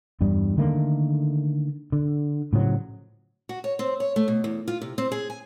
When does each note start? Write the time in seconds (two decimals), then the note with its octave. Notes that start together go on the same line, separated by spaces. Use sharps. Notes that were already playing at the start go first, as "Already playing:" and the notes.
0.21 E2 G2 G3
0.58 D3 D#3 A3 A#3
1.92 D3
2.53 A2 C#3 F3 F#3
3.49 F#4
3.64 C#5
3.79 C4
4.00 C#5
4.16 A3
4.28 B2
4.44 E2
4.68 F4
4.82 C3
4.98 C4
5.12 G#4
5.30 G#5